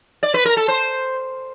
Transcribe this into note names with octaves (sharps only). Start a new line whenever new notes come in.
D5
B4
A#4
A4
C5